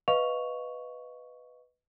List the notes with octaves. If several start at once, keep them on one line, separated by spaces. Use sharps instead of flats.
B4 D#5 F5 C#6 F7